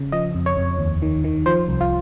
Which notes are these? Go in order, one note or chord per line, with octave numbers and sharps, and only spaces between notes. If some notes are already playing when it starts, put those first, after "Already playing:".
Already playing: C#3
F3 D#5
F2
C#5
F2
D#2
D#3
D#3
F3 C5
C2
F4